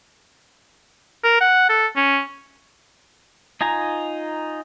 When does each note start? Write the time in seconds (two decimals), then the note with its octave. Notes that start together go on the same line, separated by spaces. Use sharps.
1.24 A#4
1.41 F#5
1.69 A4
1.96 C#4
3.61 D#4 F4 G#5 A#5